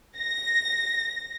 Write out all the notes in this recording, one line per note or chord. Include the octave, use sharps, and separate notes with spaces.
A#6